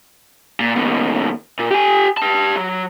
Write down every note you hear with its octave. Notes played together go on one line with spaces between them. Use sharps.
A#2
D#2 B2
A#2
G4 G#5
G4 A5
F#3